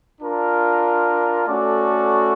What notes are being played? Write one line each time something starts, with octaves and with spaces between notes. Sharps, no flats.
D4 F4 A#4
A3 C#4 F#4 A4 D5